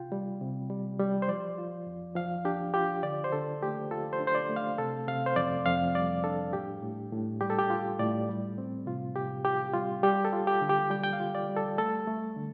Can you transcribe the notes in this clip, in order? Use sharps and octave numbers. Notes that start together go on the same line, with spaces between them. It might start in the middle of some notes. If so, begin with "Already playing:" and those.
Already playing: C3 F4 G5
G3
C3
G3
G3
C5
F3 D5
F4
F2
F3 F5
D4 G4
F4 G4
D3 D5
C5
D3 A4
A3 G4
F4 A4
C5
D4
C5
D5
A3
F5
C3 A4
C3 F5
C5
F2 D5
F2 F5
G3 D5
D4 A4
A2 G4
A2
A2
G3 G4
A4
G4
F4
A2 D5
G3
C4
C3 F4
C3 G4
F4 G4
G3 F4
G3 G4
A4
F4
G4
D3
G4
G3 G5
G5
F5
F4
D5
G3
A4
A3 A4
A3
D3